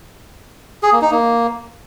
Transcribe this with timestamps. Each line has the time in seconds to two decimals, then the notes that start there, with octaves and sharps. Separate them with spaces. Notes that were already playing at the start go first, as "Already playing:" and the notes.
0.83 G#4
0.92 A#3
1.02 D#4
1.11 A#3